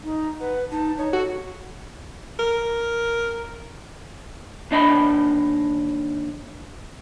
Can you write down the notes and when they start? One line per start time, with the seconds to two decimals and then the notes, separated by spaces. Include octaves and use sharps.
0.04 D#4
0.40 B4 F#5
0.71 D#4 A5
0.98 D#4 C#5
1.13 F#4 A4
2.39 A#4
4.71 D#2 D4 D#5 A#5 B5